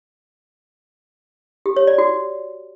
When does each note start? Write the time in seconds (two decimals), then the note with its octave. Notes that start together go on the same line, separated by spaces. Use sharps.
1.66 G4
1.77 C#5
1.87 D5
1.98 F#4